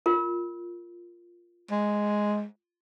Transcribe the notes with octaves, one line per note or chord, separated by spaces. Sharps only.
F4 A#4
G#3